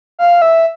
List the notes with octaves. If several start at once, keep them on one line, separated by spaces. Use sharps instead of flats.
F5
E5